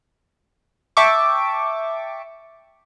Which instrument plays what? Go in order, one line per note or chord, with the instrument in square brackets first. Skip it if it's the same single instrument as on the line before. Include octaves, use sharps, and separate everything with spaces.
[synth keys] E5 G5 A5 C#6 D6